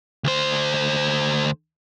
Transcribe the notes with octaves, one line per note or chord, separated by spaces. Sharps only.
D2 C5